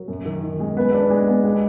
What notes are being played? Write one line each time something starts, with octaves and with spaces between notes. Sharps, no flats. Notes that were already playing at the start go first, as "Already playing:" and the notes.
Already playing: F#3 A#4
F#2
D#3
D#3
G#3
B3 B4
D4
G#3
B3
G#3